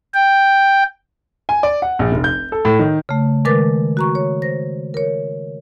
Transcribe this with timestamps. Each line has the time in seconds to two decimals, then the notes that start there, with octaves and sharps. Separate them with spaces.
0.14 G5
1.49 G#5
1.63 D5
1.82 F#5
1.99 A#1
2.12 F1
2.24 G6
2.52 A4
2.65 A2
2.79 D#3
3.09 C#3 A3
3.45 D#3 G#3 A#4 B4 D6 A6
3.97 F#4 A#5 C#6
4.15 C#5
4.42 C5 A#6
4.94 A#4 C#5